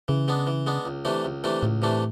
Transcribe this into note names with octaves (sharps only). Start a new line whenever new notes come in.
C#3 E3
G#3 B3 D4
E3
G#3 B3 D4
C#2
C3 E3 A3 D4
C#2
C3 E3 A3 D4
C#2 A2
C3 E3 A3 D4